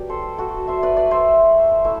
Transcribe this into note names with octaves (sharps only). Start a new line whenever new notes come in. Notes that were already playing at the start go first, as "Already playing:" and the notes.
Already playing: F#3 B3 D4 G4 D5
A4 C5
F#4 A4
C5 E5
B4 D5
B4 D5
C5 E5
A3 E4 E5